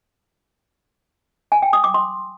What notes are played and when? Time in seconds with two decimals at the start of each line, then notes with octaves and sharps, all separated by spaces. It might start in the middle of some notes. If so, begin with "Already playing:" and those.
1.52 G#5
1.62 G5
1.73 D#6
1.84 D6
1.94 C6